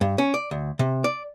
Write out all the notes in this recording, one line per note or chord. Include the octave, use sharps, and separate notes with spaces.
G2
C#4
D5
D2
C3
D5